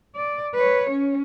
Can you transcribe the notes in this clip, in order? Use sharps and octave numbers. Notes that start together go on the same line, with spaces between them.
D5
B4 C#5
C#4